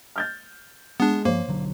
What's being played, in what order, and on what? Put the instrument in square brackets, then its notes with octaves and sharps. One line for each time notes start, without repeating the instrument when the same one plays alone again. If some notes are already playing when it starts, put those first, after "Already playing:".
[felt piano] F6 G6 A6
[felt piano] G#3 [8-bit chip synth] B3 D4
[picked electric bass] G2 F3 [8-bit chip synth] A#3 [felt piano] C5 C#5
[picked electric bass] B1 D3 F#3